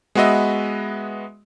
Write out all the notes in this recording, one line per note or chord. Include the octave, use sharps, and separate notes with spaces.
G#3 B3 F#4 B4 D#5 E5